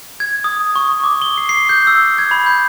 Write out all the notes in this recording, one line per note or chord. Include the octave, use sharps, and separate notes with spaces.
G#6
D#6
C#6
D6
G7
C7
C7
G6
E6
G#6
B5
G6